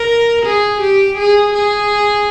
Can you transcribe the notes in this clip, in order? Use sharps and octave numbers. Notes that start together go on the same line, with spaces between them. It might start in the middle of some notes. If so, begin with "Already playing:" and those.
Already playing: A#4
G#4
G4
G#4
G#4